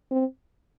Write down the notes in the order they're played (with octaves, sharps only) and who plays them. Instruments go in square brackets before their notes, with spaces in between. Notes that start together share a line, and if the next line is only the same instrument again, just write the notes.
[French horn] C4